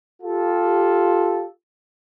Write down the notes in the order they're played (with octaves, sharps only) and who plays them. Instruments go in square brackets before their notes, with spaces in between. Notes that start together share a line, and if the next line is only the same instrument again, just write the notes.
[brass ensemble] F4 G4 A4